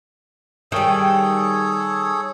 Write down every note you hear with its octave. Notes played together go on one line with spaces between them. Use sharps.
D#3 G3 G#4 A4 C#5